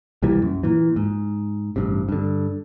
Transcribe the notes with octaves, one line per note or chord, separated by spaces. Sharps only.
C2 A#2 E3 G3
F#2
A#2 E3
G#2
A1 G2 C3
G2 D3